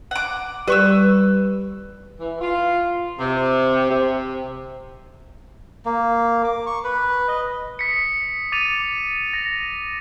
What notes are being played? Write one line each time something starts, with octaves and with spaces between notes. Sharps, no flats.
F#5 D6
G3 B4 C#6 E6
E3
F4
C3
C3
A#3
D6
C#6
B4
D#5
D#6 B6 C#7
D6 A6 D#7 F7
A#6